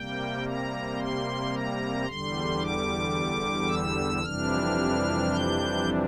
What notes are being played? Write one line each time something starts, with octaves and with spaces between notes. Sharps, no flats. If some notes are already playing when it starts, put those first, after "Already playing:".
Already playing: C3 G3 A#3 G5
A#5
C6
A#5
E2 D3 G3 C6
D6
E6
F2 C3 E3 G3 D4 F6
G6